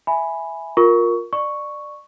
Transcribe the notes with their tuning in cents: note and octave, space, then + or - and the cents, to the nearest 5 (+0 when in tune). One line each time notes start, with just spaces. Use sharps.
E5 +0 G#5 +0 B5 +0
F4 +20 A#4 +5 C#6 +15
D5 +20 C#6 +0